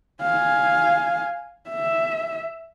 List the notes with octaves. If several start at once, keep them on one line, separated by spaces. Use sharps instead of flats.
F5 G#5
E5